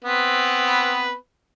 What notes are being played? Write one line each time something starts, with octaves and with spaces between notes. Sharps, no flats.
B3 C4 B4